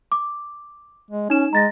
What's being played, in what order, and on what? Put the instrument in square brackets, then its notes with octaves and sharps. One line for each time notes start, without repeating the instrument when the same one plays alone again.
[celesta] D6
[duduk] G#3
[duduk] C#4 [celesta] D#4 E7
[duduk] G#3 [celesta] A#5 A6 A#6